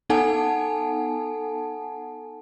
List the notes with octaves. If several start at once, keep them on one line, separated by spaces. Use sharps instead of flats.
B3 D#4 A4 F#5 G#5 A5